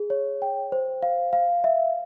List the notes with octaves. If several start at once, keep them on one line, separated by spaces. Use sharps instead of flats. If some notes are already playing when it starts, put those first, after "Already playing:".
Already playing: G#4
C#5
G5
C5
F5
F5
E5